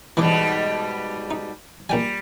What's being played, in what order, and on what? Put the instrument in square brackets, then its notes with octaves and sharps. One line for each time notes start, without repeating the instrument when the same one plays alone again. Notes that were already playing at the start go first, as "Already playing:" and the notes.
[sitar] G#2 B2 G3 [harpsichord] E3 E4 D6
[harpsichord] D#4
[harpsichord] A#1 G5 G#5 [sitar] G3